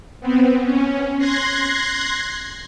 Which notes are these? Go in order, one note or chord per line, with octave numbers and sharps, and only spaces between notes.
B3 C4
C#4
C6 F#6 G#6 A#6 C7